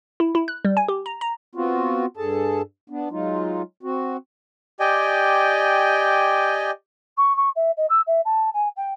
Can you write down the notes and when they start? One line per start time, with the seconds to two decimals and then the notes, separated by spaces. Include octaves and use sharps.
0.20 E4
0.35 E4
0.48 F#6
0.65 G3
0.77 G#5
0.88 G4
1.06 A#5
1.21 A#5
1.55 B3 C4 F4 F#4
2.17 G2 G#4 A4 A5
2.90 B3 D4
3.11 F#3 G#3 D#4 F4
3.83 C4 F#4
4.80 G4 D5 D#5 G5 G#5
7.17 C#6
7.36 C#6
7.55 E5
7.77 D#5
7.89 E6
8.07 E5
8.25 A5
8.53 G#5
8.76 G5